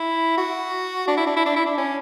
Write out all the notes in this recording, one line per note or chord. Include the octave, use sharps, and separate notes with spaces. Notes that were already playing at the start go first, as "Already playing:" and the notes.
Already playing: E4
F#4
D4
E4
D4
E4
D4
E4
D4
C#4